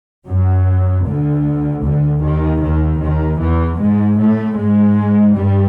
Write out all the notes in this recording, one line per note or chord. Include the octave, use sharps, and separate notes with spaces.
F#2 F#3
D2 D3
D2 D3
D#2 D#3
D#2 D#3
D#2 D#3
E2 E3
G#2 G#3
A2 A3
G#2 G#3
G2 G3